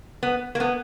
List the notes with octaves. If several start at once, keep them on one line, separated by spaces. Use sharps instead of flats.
B3
A#3
B3